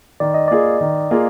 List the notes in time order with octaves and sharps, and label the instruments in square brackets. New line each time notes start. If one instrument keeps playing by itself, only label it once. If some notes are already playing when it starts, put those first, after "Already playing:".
[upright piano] D#3 [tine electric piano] D5
[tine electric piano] D#5
[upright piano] A#3 F4 G#4 [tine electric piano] D5
[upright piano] D#3
A#3 F4 G#4